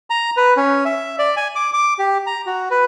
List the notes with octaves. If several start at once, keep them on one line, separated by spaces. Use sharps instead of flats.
A#5
B4
C#4
E5
D5
G#5
D6
D6
G4
A#5
F#4
B4